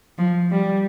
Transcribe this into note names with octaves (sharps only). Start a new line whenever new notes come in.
F3
G3